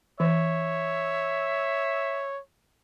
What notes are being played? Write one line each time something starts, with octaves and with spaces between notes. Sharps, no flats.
E3 C#5 E5